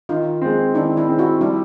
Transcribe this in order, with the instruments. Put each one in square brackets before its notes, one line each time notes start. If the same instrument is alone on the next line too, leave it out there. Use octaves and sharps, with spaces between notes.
[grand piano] D#3 [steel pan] D#4 F4
[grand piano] G#3 C4
[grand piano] D#3 [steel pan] D4 E4
[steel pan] D4 E4
[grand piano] G#3 C4
[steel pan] E4 F#4
[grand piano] G3 [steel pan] D4 E4